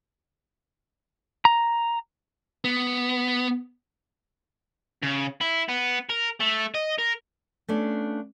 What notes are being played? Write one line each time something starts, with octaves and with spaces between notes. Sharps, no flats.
A#5
B3
C#3
E4
B3
A#4
A3
D#5
A#4
A3 B3 C#4 D4 F4